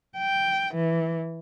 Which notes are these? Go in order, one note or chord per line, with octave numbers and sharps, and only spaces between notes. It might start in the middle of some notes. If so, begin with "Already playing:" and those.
G5
E3